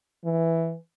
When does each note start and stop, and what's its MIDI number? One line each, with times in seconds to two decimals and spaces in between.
0.25 0.75 52